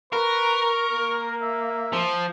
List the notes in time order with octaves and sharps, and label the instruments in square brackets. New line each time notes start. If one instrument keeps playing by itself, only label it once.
[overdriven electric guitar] A#4 [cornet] B4 [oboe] C#6
[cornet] A#3
[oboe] E5
[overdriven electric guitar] F3